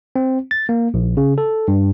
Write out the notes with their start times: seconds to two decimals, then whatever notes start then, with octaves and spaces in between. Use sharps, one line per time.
0.16 C4
0.51 A6
0.69 A#3
0.94 A#1
1.17 C#3
1.38 A4
1.68 G2